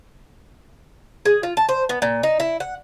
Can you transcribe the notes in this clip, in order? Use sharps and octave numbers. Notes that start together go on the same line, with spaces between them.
G#4
F4
A5
C5
B3
A#2
D#4
E4
F#5